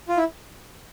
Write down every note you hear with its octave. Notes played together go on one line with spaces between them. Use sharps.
F4
E4